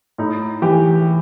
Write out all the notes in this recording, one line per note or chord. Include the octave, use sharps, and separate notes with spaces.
A2 D#4
E3 G4